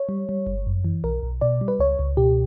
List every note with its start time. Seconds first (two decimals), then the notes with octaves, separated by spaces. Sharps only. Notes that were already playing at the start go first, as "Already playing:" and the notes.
Already playing: C#5
0.09 G3
0.29 G3
0.47 G1
0.67 F#2
0.85 E3
1.04 B1 A#4
1.23 B1
1.41 B2 D5
1.61 G3
1.68 B4
1.79 C#2 C#5
1.99 C#2
2.17 B2 G4